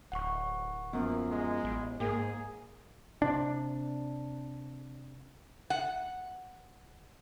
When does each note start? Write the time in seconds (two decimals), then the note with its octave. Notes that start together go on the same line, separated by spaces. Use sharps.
0.12 D1 F#5 C#6
0.93 F#2 F3 A#3 B3
1.31 G#3
1.64 A1
2.00 G#2 A#3 G#4
3.22 C3 D4
5.70 F#5